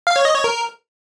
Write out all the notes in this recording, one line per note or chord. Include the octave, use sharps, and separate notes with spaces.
F5
C#5
D#5
C#5
A#4